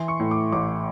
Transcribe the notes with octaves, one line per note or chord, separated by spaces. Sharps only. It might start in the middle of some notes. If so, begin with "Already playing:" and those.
Already playing: E3 C6
C#6
A2
D6
A1 D6